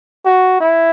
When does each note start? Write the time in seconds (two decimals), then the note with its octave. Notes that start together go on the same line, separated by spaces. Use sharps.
0.25 F#4
0.60 E4